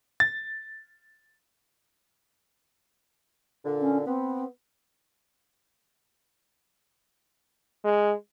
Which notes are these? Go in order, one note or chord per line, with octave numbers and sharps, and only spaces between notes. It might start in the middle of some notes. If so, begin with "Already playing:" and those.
A6
A#2 D3
C#4
B3 C4
G#3